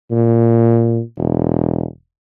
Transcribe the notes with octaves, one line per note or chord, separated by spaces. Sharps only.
A#2
E1